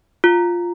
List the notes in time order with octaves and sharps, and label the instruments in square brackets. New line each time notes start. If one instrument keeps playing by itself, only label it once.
[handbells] F4